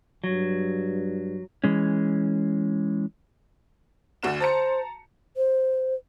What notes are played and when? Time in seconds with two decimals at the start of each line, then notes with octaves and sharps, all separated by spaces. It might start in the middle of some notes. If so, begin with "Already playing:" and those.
0.24 G2 F#3
1.64 E3 G#3 C#4
4.23 D2 D3 E7
4.40 C5 A5 A#5 C#7
5.37 C5